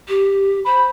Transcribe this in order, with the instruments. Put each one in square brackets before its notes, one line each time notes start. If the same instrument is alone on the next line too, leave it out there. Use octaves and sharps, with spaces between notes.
[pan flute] G4
[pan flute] C5 [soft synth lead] B5